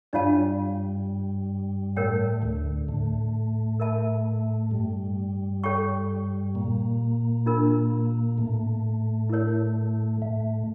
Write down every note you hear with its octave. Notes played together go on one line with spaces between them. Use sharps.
G2 G3 D4 F4 C#5 F5 A5
A2 A3 A#4 C#5 G5
D2 D3
A2 A3
A#4 E5 A5
G2 G3
A4 C#5 G5 C#6
A#2 A#3
D4 F4 A#4
A2 A3
E4 A#4 C#5
A2 A3